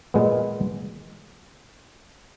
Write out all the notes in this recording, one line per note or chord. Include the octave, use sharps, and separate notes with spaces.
A#2 G#3 B3